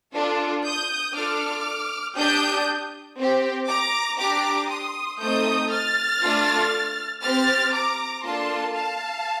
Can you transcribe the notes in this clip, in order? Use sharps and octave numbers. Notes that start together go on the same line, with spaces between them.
D4 F4 A4
D#6 G6
D4 F4 A4 D6 F6
D4 G4 D#6 G6
C4 G4
A#5 D6
D4 G4 A#5 D6
C6 D#6
A3 C4 D#4 D#6 G6
F6 A6
A3 D4 F4
C4 G4 F6 A6
A#5 D6
A#3 D4 F4 A4 A5 C6
F5 A5